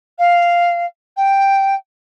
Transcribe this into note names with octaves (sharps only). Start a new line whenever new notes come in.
F5
G5